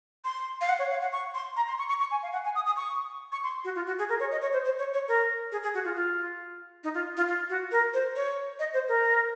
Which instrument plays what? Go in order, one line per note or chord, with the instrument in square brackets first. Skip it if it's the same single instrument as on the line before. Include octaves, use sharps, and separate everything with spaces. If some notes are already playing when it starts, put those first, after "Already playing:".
[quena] C6
F5
F#5
C#5
F5
F#5
C#6
C6
A#5
C6
C#6
C#6
C#6
G#5
F5
F#5
G#5
D#6
D#6
C#6
C#6
C6
F#4
F4
F#4
G#4
A#4
C#5
D#5
C#5
C5
C5
C#5
C#5
A#4
G#4
G#4
F#4
F4
F4
D#4
F4
F4
F4
F#4
A#4
C5
C#5
D#5
C5
A#4